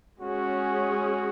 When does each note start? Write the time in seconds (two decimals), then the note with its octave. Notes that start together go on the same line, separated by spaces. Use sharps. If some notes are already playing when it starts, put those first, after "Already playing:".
0.20 G#3 C#4 F#4 G#4